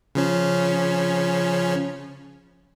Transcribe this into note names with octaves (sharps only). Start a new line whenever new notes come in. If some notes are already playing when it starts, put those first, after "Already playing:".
C#3 F3 C#4